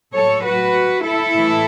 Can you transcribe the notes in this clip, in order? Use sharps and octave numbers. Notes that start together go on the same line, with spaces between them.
A2 F#3 A4 C#5
F#4 B4
E4 A4
A2 E3